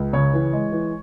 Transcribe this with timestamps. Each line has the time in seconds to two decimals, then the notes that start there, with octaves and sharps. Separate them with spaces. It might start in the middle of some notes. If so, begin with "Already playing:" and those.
Already playing: C#2
0.13 C#3 C#5
0.34 E3
0.53 G#3
0.72 E3